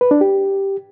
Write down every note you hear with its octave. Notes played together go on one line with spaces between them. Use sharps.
B4
D4
G4